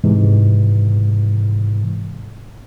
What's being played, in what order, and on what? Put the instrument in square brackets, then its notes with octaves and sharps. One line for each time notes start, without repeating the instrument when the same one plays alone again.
[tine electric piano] G#2 C3 E3 G#3